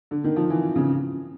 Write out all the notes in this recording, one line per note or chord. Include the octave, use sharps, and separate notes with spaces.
D3
D#3
F3
E3
C#3